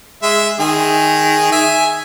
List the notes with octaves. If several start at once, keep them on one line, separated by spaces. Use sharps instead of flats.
G#3 E5
D#3 G#4
E5 G#5